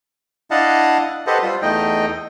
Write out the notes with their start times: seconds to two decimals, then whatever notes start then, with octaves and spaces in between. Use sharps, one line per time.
0.51 D4 E4 D#5 F5 F#5 A5
1.27 G4 A4 B4 C5 D#5 F#5
1.42 G3 F4 C5
1.62 E2 A3 D#4 D#5 G5